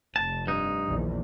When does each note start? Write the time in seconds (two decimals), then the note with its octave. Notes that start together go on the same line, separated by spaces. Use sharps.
0.16 F1 A5
0.47 G2 D#4
0.87 A#1 E2 D#3